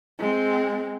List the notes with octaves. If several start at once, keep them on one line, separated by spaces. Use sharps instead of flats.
G#3 C4